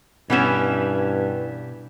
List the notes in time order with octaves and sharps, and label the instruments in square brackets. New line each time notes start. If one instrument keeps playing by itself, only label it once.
[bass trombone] G2 [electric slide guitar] B2 G4 E5 [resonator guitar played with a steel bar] E3 B3 C#4